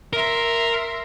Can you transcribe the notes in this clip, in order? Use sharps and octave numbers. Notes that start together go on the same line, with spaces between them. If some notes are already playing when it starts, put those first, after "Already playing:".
A#4 E5 C6